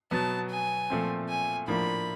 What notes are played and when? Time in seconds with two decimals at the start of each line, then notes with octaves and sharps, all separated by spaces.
0.11 B2 F#3 B3 A5
0.50 G#5
0.90 A#2 F3 A3 C4
1.29 G#5
1.68 A2 F3 A#3 D4 B5